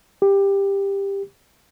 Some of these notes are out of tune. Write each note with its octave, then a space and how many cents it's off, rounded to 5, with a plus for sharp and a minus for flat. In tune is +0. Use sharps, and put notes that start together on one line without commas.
G4 +15